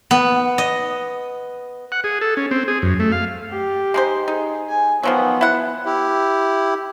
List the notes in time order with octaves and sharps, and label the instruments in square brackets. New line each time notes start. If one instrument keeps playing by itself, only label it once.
[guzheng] B3
D#5
[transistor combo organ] F#5
G#4
A4
C#4
C4
G#4
F#2
A3
F5
[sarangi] G4
[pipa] G#3 D#4 C5
[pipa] D#4 [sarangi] G#4
[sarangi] G#5
[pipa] D#3 F3 F#3 [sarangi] B3
[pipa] E4 F#5
[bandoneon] E4 G4